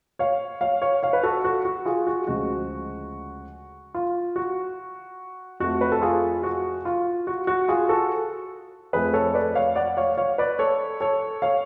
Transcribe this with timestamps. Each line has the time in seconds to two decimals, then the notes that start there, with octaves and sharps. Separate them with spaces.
0.19 C#5 F5
0.61 C#5 F5
0.82 C#5 F5
1.03 C#5 F5
1.13 B4
1.23 F#4 A4
1.44 F#4
1.65 F#4
1.86 F4 G#4
2.07 F#4
2.27 D2 C#3 F3 G#3 F#4
3.95 F4
4.36 F#4
5.60 F2 F3 A3 F#4
5.81 B4
5.92 A4
6.02 F4 G#4
6.43 F#4
6.85 F4
7.27 F#4
7.47 F#4
7.68 F4 G#4
7.89 F#4 A4
8.93 F2 F3 A3 G#4 B4
9.13 A4 C#5
9.34 B4 D5
9.55 C#5 F5
9.76 D5 F#5
9.97 C#5 F5
10.18 C#5 F5
10.38 B4 D5
10.59 A4 C#5
11.01 A4 C#5
11.42 C#5 F5